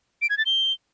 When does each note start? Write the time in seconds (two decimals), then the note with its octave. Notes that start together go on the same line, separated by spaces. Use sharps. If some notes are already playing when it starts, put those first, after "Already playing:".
0.22 D7
0.30 G#6
0.38 A6
0.46 G7